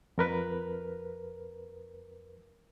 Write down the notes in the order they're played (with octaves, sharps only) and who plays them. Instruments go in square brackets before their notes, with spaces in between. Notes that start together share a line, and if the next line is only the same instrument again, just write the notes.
[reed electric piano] F2 A#4 B4